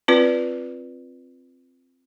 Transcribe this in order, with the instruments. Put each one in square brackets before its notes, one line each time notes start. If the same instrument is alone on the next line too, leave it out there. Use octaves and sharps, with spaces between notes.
[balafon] C4 F4 B4 D5